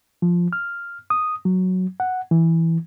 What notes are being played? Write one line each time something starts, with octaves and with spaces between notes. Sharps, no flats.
F3
F6
D#6
F#3
F#5
E3